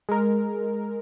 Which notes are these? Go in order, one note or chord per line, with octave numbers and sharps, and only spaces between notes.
G#3 A#4